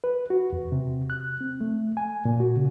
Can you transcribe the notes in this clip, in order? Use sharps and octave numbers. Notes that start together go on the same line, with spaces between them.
B4
F#4
E2
C3
F#6
C4
A3
G#5
A#2
F#4
C#3